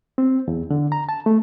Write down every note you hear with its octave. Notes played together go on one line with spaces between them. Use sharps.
C4
E2
D3
A#5
A5
A3